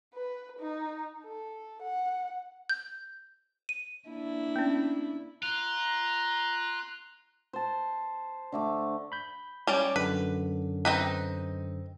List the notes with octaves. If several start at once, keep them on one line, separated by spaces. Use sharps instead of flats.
B4
D#4
A4
F#5
G6
D#7
A#3 D4 E4
B3 C#4
F4 A#5 F#6
C5 A5
D3 A3 D6
B5 G6
G3 C#4 C#5 D5
F#2 D3 B4
C4 D#4 B4